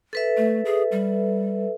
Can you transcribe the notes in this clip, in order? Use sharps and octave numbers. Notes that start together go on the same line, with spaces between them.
A4 B4 E5
A3
G#4
G3